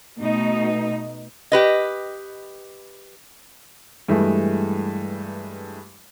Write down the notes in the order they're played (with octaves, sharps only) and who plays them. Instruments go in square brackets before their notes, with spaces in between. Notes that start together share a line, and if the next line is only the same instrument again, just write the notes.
[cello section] B2 A3 D#4
[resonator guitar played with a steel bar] G4 B4 D#5
[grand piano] G2 E3 G#3 A3